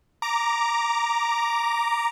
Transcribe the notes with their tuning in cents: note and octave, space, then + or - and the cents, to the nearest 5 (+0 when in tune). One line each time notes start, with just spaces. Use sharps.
A#5 +0 D6 +0